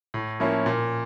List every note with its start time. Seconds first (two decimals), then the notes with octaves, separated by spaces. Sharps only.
0.14 A2
0.40 F3 A#3 C#4 E4
0.66 A#2